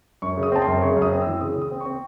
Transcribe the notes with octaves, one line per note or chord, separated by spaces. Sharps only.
F#2 C#6
C#3
D#6
C4 A5
C6
F#2
C#3 C#6
F#2
D#6
C4
E6
E3
C#3 D#6
C#3
D#6
C4
C#6
C4